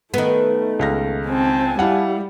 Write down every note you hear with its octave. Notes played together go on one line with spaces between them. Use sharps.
D#3 A3 B3
C#2 F5 A#6
C4 G#5 A5
G3 E4 F5 F#5